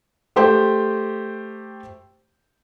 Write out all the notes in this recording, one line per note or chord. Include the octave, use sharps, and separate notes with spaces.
A3 G4 C5 G5